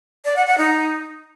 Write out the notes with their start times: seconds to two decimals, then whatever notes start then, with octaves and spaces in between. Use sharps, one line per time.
0.25 D5
0.36 F#5
0.47 F#5
0.58 D#4